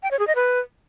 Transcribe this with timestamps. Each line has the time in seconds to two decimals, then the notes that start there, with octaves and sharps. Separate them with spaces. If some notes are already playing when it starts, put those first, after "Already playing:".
0.03 G5
0.11 C#5
0.19 G#4
0.27 D#5
0.35 B4